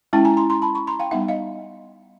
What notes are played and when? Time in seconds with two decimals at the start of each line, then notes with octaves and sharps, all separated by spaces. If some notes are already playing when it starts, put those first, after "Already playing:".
0.13 G#3 C#4 E4 G5 A5
0.25 G#5 A#5
0.37 A#5 C6
0.50 A#5 C6
0.62 A5 B5
0.75 B5 C#6
0.87 A#5 C6
0.99 F5 G5
1.11 G3 B3 D#4 E5 F#5
1.28 D#5 F5